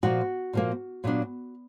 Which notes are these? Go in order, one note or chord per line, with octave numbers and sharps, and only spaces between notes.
A#2 F3 A#3 F#4
A#2 F3 A#3
A#2 F#3 B3 D4